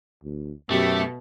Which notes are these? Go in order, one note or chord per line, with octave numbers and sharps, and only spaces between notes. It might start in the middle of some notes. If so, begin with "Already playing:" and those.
D2
F#2 B2 A3 G4